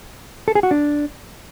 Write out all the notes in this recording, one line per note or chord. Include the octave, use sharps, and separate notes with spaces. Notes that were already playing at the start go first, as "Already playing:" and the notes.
A4
G#4
F#4
D4